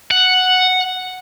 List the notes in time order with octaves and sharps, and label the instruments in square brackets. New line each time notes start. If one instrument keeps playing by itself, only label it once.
[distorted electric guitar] F#5